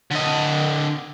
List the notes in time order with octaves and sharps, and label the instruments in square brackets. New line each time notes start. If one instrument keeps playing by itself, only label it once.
[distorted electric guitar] D3 D#5